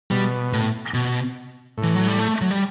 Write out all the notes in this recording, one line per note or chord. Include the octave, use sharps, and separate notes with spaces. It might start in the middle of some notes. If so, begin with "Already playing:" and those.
B2 G3
A2
B2
A2
E3
F#3
G3
A3
F#3
G3